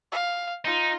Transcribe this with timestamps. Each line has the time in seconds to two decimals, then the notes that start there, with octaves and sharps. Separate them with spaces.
0.12 F5
0.65 D#4 F4